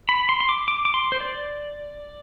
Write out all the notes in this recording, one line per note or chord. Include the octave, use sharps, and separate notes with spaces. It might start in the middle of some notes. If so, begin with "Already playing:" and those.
B5
C6
C6
D6
D6
D6
C6
C5
D5